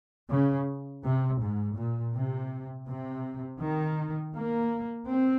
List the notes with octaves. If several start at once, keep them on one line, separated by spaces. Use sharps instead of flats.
C#3
C3
G#2
A#2
C3
C3
D#3
A#3
C4